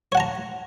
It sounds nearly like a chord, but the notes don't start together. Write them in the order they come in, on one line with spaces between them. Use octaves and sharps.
C#5 F#5 A5 A#5